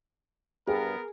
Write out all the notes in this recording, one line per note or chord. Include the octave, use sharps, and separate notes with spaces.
G2 B3 G#4 A#4